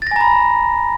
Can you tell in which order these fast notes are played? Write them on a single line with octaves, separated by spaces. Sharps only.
A6 A#6 G#5 A#5 B5